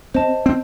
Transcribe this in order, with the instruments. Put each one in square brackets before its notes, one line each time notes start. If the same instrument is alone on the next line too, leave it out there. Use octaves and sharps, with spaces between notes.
[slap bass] C4 [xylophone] C5 D#5 A5
[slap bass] C4